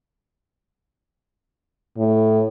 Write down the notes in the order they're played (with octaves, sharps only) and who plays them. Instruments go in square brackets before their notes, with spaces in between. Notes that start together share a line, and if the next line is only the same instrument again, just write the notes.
[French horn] A2